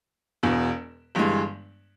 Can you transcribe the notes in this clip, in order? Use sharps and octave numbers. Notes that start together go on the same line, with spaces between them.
E1 E2 B2
G1 G2 E3 G#3